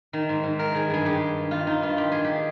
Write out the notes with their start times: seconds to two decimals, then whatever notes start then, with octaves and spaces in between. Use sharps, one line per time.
0.13 D#3
0.29 G#2
0.44 G#2
0.59 D#3 A#4
0.75 D#3 G#4
0.90 G2 G#4
1.05 G2 G4
1.21 G2
1.37 G2
1.51 D#3 F4
1.67 D#3 D#4
1.82 G2 F4
1.97 D#3 G4
2.12 D#3 G#4
2.24 G4